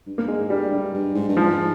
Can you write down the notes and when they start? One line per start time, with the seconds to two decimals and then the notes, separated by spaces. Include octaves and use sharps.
0.07 G2
0.18 A#3
0.28 G#2 G#3
0.50 G2 G3
0.71 G2
0.94 G2
1.15 G#2
1.29 G2
1.37 G#2 F3